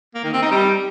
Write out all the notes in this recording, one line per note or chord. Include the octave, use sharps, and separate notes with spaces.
A#3
D#3
C4
D#4
G3